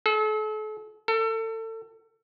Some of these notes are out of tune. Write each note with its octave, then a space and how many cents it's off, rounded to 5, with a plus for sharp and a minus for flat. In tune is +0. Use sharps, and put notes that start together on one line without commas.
A4 -40
A4 +30